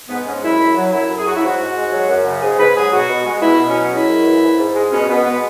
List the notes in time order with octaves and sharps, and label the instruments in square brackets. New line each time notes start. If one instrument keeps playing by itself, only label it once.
[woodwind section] G#2 B3
G#3 C#4
F#2 E4
F#2
F#3
F#2 E4
F#2
G#4
F#3 F#4
E4
G#2 F#4
G#2
G#3
F#3
F#2
C#3
G#2 G#4
G#2 B4
F#3 G#4
B2 F#4
B2
G#3
B2 E4
B2
C#4
F#3
G#3 E4
F#2
E3
G#2
G#2
G#3
B2 C#4
B2 B3
G#3 B3